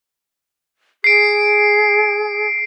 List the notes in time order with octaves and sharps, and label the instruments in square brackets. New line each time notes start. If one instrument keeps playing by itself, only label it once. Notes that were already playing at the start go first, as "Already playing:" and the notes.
[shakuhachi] G#4 [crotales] C7 D7